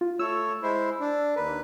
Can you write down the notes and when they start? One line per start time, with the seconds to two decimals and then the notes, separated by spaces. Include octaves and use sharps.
0.01 F4
0.19 A3 C#5 E6
0.63 G#3 E4 C5
1.00 D4
1.36 D#2 A#4 B4